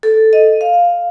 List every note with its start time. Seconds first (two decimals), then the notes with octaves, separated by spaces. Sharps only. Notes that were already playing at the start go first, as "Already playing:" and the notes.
0.03 A4
0.33 D#5
0.61 F5